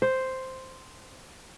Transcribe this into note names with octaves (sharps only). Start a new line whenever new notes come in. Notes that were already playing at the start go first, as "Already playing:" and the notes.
C5